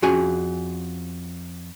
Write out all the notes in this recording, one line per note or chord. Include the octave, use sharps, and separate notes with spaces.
F2 C#4 F#4 G#4 G#5